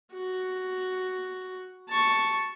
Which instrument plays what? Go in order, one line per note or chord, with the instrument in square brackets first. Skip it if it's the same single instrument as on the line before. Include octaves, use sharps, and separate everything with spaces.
[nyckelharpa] F#4
A5 C#6